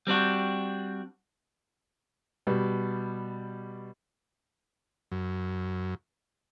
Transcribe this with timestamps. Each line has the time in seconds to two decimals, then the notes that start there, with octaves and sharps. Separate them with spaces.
0.07 G3 C4 D4 F#4
2.47 B2 G3
5.12 F#2